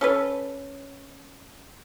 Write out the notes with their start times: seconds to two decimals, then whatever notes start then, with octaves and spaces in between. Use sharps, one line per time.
0.01 C#4 A4 B4